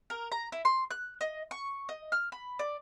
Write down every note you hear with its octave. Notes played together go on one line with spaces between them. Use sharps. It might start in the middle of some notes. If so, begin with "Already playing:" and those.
A#4
A#5
E4
C6
F#6
D#5
C#6
D#5
F6
B5
D5